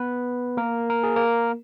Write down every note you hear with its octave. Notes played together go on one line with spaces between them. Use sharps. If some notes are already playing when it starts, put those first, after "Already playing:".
Already playing: B3 B4
A#3 A#4
A#4
G#4
A#3 A#4